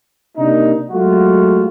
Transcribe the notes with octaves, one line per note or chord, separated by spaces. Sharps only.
C3 A#3 D4 D#4
F#3 G#3 A3 F4 F#4